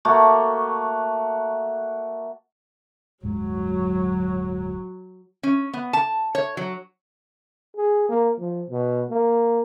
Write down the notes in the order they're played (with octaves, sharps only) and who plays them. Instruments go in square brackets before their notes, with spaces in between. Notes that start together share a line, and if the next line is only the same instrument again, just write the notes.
[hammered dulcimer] A3 A#3 F#4
[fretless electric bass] D1 G2 G#3 [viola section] F#3
[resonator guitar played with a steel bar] C#4
B3
A5
C#5
F#3
[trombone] G#4
A#3
F3
B2
A#3